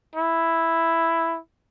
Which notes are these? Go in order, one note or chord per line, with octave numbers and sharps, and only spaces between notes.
E4